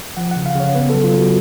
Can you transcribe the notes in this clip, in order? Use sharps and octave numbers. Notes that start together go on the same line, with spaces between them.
F3 F#5
F#5
C#3
F5
C#3 C#5
B3 B4
A4
F#3
F4
F#3 F#4